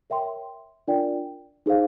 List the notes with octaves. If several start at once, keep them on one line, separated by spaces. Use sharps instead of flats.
A#4 C#5 E5 G5 C6
D4 F4 A#4 D5 G5
D#4 G#4 C5 F5